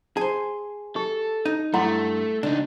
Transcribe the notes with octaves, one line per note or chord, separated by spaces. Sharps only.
G#4 C5 A5
G4 A4
D#4
G2 A3 E4 F#5 C6
C#2 D4 D#4